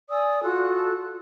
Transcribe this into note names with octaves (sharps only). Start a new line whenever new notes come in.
D5 G#5 D#6 E6
F4 F#4 A4 F#6